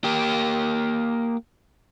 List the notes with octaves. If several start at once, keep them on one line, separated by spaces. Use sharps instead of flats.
A#3 G4